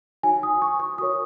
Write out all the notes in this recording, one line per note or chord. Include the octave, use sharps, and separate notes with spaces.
D#4 F#4 C#5 G#5
D#6
C#6
C#6
F#4 A#4 C#5 D#6